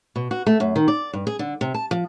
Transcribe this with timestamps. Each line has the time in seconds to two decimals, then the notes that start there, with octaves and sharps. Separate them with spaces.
0.16 B2
0.31 F#4
0.46 A3
0.60 F#2
0.76 D#3
0.88 D5
1.13 G2
1.27 G#4
1.39 D3
1.61 C3
1.74 A5
1.91 F3